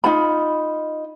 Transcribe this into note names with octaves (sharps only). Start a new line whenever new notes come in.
D#4 F4 B5